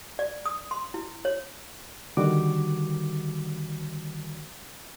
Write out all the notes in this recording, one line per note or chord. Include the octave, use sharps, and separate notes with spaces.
D5
D#6
C6
E4
C#5
D3 D#3 G3 F#4 D6